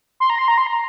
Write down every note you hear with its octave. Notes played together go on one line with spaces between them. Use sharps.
C6
A#5
C6
A#5
C6
A#5